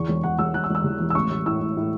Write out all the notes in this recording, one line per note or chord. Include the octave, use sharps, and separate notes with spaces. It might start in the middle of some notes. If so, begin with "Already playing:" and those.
Already playing: E2 C#6
E1
E1 F#5
E1 E6
E1 F#6
E6
E1
E6
E2
E1
E6
A1 C#6
A1
A2 E6
A2
A2